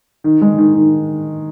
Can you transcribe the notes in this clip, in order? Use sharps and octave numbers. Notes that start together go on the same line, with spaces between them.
D#3
G#3
D#3
D#3